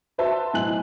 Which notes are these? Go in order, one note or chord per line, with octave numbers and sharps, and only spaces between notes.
F#4 B4 C5 E5 A5 C6
B1 A2 G#5 F#6 F#7